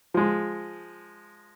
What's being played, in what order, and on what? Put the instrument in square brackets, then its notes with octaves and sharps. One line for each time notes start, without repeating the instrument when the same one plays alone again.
[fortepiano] F3 G#3